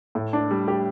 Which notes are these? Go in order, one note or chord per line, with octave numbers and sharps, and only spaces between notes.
A2
D4
G3
G4